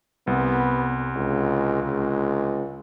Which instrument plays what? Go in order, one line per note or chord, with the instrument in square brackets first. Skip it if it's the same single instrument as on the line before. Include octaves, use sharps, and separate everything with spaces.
[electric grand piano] C2 [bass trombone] B3
[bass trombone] C#2
C#2